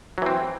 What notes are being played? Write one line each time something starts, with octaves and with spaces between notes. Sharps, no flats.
E3 F#3 C4